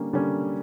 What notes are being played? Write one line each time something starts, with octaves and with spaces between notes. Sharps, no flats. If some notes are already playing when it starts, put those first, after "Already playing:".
Already playing: D3 G3 A#3 C#4
D3 G3 A#3 C#4